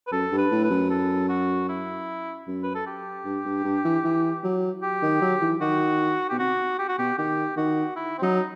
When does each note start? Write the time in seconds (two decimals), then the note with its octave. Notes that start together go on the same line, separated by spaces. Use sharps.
0.07 B4
0.12 F#2 A4
0.32 G2
0.37 B4
0.51 A2
0.64 B4
0.70 F#2
0.90 A4
1.29 F#4
1.69 E4
2.47 F#2
2.63 B4
2.75 A4
2.86 G4
3.25 G2
3.45 G2
3.64 G2
3.85 E3
4.04 E3
4.44 F#3
4.82 G4
5.02 D#3
5.21 F#3
5.41 E3
5.61 D#3 F#4
6.29 B2 G4
6.39 C3 F#4
6.78 G4
6.88 F#4
6.98 B2 G4
7.18 D#3 G4
7.57 D#3 F#4
7.96 E4
8.18 C4
8.22 F#3 D#4